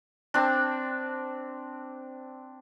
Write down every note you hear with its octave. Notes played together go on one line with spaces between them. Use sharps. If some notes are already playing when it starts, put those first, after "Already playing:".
C4 D4